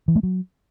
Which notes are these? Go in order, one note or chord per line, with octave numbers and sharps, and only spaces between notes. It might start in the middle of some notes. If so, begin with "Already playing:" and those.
E3
A3
F#3